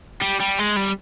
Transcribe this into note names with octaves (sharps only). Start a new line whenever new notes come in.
G3
G3
G#3
G3